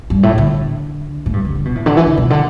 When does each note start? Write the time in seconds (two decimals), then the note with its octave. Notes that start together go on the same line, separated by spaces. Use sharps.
0.10 G2
0.23 A2
0.38 D3
1.26 A2
1.33 G2
1.45 D3
1.55 D3
1.65 B2
1.75 A2
1.86 D3
1.97 E3
2.07 D3
2.17 B2
2.30 D3